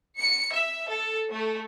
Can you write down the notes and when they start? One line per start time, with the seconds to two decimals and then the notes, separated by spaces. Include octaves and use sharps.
0.18 C#7
0.53 E5
0.89 A4
1.29 A3